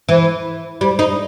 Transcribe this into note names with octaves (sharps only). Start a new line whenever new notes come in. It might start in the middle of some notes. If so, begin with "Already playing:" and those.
E3
G3
D#4